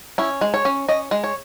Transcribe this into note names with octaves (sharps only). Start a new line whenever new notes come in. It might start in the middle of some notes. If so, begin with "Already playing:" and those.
C#4 E4
G#3
C#5
C#4
C#4 D#5
G#3
C#5